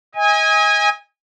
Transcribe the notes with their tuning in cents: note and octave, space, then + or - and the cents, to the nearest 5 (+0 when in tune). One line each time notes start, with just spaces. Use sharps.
D#5 +35 G#5 -20